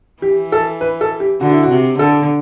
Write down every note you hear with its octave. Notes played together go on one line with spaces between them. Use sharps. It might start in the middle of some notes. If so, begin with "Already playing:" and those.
E3 G4
A4
B4
A4
G4
D3 F#4
E4
F#4
C3
D3 A4